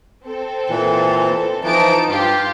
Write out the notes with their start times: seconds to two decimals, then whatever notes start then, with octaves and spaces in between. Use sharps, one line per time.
0.24 C4 A4
0.69 A#2 E3
1.64 E3 F3 D#4 A5 D7
2.08 G2 F4 G4